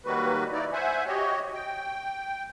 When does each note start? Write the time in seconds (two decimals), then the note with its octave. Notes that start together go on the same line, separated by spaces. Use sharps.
0.05 D#3 F#3 G3 A#3 F#4 B4
0.52 D#4 E4 D5
0.73 C5 E5 F#5 G#5
1.07 F#4 G4 C#5 D#5
1.54 G5